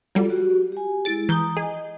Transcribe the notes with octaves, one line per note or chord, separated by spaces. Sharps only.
F#3 G3 F4 A4
F#4 G4
G4 G#5
G#3 E4 G#4 A6 D7
E3 A#5 D#6 G6
G#4 D#5